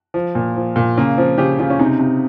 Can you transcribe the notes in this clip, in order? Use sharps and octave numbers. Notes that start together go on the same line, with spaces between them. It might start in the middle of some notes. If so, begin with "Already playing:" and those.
F3
A#2
F3
A#2
C#3 A#3
F3 C4
C#3 G4
C#3 F4
C#4
C3 D#4
C3